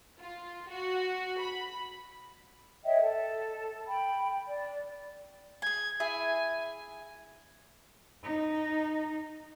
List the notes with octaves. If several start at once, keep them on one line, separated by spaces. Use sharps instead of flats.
F4
F#4
B5
C#5 D#5 E5 G5
A4
G5 B5
D5
G#4 G#5 G#6
E4 G#4 E5 G#5
D#4